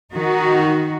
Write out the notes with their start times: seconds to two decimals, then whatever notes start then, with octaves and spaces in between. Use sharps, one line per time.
0.14 D#3 D#4 F#4